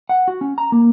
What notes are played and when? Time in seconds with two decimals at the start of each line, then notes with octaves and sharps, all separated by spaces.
0.09 F#5
0.28 F#4
0.41 C#4
0.58 A#5
0.72 A#3